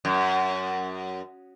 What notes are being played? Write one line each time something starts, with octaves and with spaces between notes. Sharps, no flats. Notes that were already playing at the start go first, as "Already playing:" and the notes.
F#2